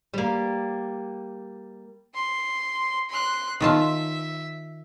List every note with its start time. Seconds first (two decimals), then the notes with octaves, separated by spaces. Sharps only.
0.13 G3 A#3
2.14 C6
3.10 C6 F#6
3.60 D#3 F4 E5 A5